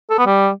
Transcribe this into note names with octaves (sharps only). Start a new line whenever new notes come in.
A4
B3
G3